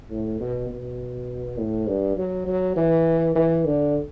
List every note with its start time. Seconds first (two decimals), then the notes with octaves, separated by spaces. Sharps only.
0.11 A2
0.40 B2
0.69 B2
1.58 A2
1.87 G2
2.17 F#3
2.47 F#3
2.76 E3
3.35 E3
3.65 D3